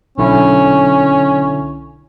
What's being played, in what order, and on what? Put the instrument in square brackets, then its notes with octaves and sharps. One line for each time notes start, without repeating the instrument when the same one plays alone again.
[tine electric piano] B1 D3 E4 [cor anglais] C#4